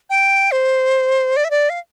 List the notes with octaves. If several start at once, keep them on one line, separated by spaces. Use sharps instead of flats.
G5
C5
D5
E5
D5
F5